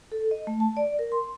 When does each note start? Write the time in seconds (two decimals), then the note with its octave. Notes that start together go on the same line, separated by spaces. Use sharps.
0.12 A4
0.31 D#5
0.47 A3
0.60 A5
0.77 D5
0.99 A#4
1.12 C6